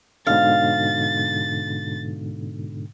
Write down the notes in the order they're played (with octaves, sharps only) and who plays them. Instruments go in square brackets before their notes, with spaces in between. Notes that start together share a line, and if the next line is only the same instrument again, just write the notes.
[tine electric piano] G#2 B2 D3 [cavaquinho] F5 [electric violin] A6